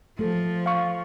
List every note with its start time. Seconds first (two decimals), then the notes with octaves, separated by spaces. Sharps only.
0.19 F3 A3 A4
0.66 F5 C#6